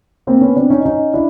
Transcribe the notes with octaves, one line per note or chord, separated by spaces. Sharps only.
A#3 C4
B3 C#4
C4 D4
C#4 D#4
C#4 D#4
D4 E4